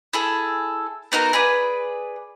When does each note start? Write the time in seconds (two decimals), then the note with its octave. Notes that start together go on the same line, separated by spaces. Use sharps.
0.13 E4 G#4 A4
1.12 B3 D#4 F#4 A#4
1.33 G#4 B4 D5